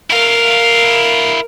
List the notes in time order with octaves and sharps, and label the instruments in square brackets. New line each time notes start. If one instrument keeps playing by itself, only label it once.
[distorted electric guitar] E4 F5 [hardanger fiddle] A#4